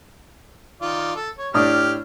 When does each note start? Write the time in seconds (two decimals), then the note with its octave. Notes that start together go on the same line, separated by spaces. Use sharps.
0.82 D#3 F4 D5
1.16 A4
1.38 C#5
1.54 A2 D4 G4 D#6 F6